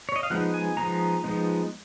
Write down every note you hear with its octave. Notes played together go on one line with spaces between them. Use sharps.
C#5
D#5
F5
F3 G#3 B3 D#4 F#5
G#5
F3 G#3 B3 D#4 A#5
F3 G#3 B3 D#4